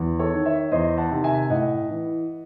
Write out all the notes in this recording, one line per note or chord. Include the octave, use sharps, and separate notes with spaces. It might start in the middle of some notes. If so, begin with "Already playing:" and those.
Already playing: E2
A4 C#5
D#3
C#5 E5
E2 C5 D#5
F#5 A5
C3 D#3
E5 G#5
A2 D#5 F#5
E3